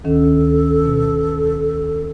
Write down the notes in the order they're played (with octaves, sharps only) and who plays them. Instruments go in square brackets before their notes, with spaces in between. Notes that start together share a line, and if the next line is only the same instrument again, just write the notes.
[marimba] D2 D#3 C#4 [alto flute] A4
[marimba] B2